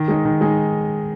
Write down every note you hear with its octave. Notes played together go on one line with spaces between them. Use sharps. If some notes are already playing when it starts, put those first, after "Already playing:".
Already playing: D#3
G#3 D#4 G#4
D#3
G#3 D#4 G#4